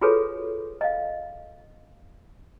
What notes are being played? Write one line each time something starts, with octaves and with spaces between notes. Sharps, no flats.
F4 F#4 G#4 A4 B4 C#5
D#5 F5